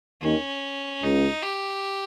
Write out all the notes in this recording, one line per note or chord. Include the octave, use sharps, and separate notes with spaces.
D#2 D#3 C#4
C#2 C#3 D#4
G4